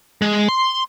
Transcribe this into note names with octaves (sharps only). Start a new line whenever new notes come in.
G#3
C6